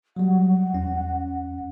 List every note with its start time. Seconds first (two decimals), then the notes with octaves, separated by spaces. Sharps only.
0.16 F#3 G3 F#5
0.74 E2 C#4